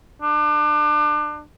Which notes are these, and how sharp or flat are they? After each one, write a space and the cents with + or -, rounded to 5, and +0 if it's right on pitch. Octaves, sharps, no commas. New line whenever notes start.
D4 +30